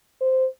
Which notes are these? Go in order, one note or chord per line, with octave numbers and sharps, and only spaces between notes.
C5